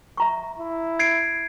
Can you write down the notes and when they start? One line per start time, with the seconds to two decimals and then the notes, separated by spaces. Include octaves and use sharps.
0.17 E5 A#5 C#6
0.59 E4
0.99 G#6 C7 D7